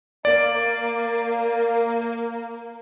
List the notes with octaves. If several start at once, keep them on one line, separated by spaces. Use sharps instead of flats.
A#3 D5